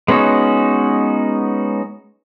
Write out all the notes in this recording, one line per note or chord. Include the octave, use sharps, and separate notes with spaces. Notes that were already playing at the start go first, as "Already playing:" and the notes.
G#3 B3 C#4 D#4 F#4